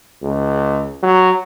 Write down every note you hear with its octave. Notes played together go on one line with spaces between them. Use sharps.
C#2
F#3